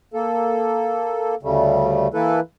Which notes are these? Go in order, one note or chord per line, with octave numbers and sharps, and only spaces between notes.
A#3 A4
D2 C#3 G3 A3
E3 A#3 E4 A4 B4